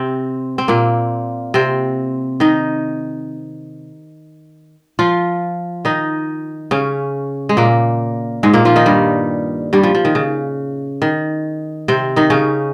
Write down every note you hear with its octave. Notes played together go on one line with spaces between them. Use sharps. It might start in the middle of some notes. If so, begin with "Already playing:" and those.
Already playing: C3 C4
C4
A#2 A#3
C3 C4
D#3 D#4
F3 F4
D#3 D#4
C#3 C#4
G#3
A#2 A#3
G#2 G#3
A#2 A#3
F3 F4
D#3 D#4
G2 G3
G2 G3
F3
F3
D#3
C#3
D#3
C3 C4
D#3 D#4
C#3 C#4